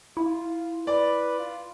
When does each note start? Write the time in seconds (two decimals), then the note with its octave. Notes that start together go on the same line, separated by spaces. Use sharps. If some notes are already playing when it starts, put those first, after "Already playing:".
0.17 E4 F4
0.87 B4 D5
1.39 F4